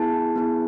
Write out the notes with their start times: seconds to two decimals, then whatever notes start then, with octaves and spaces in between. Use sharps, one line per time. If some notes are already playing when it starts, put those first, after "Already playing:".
Already playing: B3 E4 G#4 A5
0.36 B3 E4 G#4